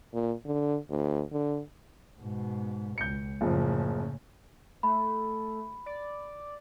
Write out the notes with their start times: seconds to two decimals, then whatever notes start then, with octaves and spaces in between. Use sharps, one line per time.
0.14 A#2
0.46 D3
0.90 D2
1.32 D3
2.19 G#2 B2
2.98 C#2 G6 C#7
3.41 F#1 A2 C#3 F3
4.83 A3 B5
5.86 D5